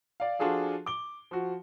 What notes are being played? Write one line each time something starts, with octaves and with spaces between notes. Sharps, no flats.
D5 F5
F3 D4 F4 F#4 G#4 A4
D6 G7
F3 F#4